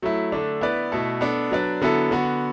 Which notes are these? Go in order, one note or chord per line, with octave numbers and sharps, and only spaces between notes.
F#3 A3 E4
D3 A3 D4
B3 E4 B4 D5
B2 A3 E4 A4
B3 D4 A4
F#3 D4 B4 D5
D3 F#3 B3 E4 A4
D3 B3 F#4